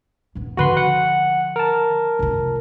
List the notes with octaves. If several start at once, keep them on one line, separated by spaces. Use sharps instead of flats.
D#1 B3
D3 F3 F#4 B4 C6
F#5
A#4 A5
F1 F4